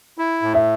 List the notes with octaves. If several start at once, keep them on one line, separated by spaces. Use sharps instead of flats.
E4
A2
E5